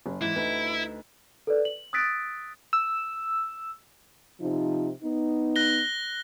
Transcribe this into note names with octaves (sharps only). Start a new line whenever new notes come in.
F#1
G#2 E3 E4
D2 D#4 B4
A4 B4 D5
F#7
D#6 E6 F#6 A6 B6 D7
E6
C3 F3 D#4
B3 D#4
F#6 A#6 G7